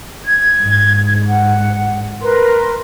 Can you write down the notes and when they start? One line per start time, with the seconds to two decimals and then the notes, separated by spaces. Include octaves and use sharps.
0.25 G#6
0.62 G#2
1.28 F#5
2.22 A#4 B4 C6